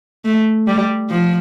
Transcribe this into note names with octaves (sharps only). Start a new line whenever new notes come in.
A3
G3
F3